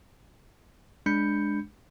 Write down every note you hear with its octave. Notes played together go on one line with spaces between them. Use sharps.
G#3 D4 B5 G6 C#7